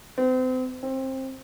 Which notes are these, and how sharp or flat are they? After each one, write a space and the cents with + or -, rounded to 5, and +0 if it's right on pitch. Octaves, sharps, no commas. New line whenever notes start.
C4 -35
C4 +20